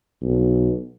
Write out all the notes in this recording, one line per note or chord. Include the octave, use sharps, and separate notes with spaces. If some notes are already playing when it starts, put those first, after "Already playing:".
B1